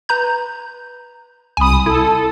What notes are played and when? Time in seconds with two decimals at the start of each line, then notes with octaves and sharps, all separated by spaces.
0.09 B4 A#5 G6
1.57 C2 G#5 B5 D#6
1.86 E4 A4